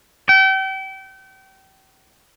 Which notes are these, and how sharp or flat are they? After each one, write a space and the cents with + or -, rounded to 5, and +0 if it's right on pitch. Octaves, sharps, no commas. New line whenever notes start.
G5 -35